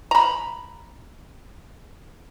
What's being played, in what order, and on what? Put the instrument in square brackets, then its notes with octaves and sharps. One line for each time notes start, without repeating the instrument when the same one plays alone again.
[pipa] A#5 B5